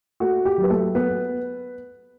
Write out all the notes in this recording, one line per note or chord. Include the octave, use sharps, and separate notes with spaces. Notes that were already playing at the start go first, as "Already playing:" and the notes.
A3 F#4
G4
F#3
B4
A3 A4
B3 B4